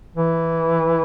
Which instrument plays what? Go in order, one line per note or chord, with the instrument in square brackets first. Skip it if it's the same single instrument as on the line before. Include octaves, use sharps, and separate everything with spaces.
[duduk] E3